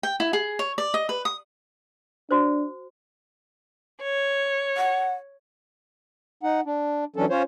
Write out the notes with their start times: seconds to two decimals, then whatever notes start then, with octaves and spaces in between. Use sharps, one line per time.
0.03 G5
0.20 E4
0.33 G#4
0.59 C#5
0.78 D5
0.94 D#5
1.09 B4
1.25 D#6
2.31 D4 F#4 C5
4.02 C#5
4.77 F#5
6.43 D#4 F#5
6.65 D4
7.16 E3 F#3 C#4 D4 A4
7.30 C#4 F4 C5 C#5